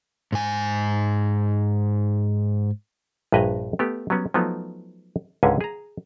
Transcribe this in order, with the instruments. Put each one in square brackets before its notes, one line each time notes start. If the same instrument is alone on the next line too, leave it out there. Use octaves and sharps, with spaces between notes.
[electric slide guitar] G#2 G#5
[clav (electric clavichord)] A#1 G2 B4 D#5 G#5 A#5
A3 B3 G4
F#3 G3 B3 C#4
F3 F#3 A3 B3 D#4
C#2 G#2 D3 C#4 G#4 G#5
G#4 A#5